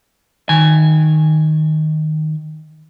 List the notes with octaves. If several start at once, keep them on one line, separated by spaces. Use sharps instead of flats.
D#3 G#5